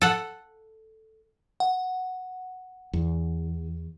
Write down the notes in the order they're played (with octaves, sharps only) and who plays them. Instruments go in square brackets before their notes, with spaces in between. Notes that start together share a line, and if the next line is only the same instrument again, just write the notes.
[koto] A4 F#5
[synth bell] F#5
[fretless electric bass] E2